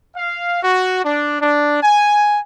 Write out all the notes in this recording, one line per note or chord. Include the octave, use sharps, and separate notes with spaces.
F5
F#4
D4
D4
G#5